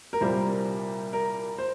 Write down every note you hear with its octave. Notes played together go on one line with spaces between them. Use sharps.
A#4
C2 A#2 G3 A#3 C5
A#4
C5